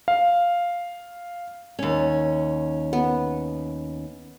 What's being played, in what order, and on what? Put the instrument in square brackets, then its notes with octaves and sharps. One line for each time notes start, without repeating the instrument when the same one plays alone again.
[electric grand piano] F5
[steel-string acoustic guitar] D#2 C#4
[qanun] B3